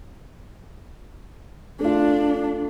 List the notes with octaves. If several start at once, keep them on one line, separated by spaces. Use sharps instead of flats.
A3 D4 F4